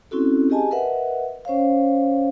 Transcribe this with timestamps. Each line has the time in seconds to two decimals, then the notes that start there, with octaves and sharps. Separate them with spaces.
0.11 C4 C#4 E4 F#4 A4
0.50 G4 G#4 D#5 G#5 A5
0.71 A#4 B4 D#5 E5 F#5
1.45 C#4 C5 C#5 F5